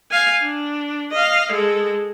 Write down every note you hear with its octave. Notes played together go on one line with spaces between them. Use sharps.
F5 G#5
D4
D#5 F5
G#3 A4